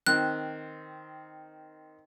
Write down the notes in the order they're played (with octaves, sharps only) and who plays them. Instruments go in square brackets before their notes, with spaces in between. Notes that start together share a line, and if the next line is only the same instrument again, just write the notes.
[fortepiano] D#3 C4 [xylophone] F#6